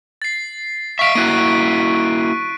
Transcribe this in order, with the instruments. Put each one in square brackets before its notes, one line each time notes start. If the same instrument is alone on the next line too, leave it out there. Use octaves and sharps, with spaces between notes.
[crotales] A6 C7
[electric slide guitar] E5 F5 [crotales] C#6 B6 D7
[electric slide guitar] A#3 E4 F#4 [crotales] F#6 D#7